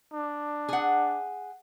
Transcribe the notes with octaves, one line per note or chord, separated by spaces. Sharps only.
D4
G#4 F#5